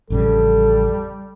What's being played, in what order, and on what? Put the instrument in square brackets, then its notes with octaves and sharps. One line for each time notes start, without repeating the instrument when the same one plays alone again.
[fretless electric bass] A1 F2 C#3 [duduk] G3 [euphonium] A4